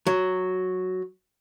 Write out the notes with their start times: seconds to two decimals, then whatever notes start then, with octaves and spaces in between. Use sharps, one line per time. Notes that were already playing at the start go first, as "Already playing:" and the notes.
0.07 F#3